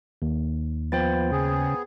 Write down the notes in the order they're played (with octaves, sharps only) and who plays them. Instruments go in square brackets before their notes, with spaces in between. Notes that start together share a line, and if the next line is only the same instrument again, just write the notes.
[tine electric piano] D#2
[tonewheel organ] F3 B3 [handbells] C5 G5 A6
[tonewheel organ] C#3 [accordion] B3 G#4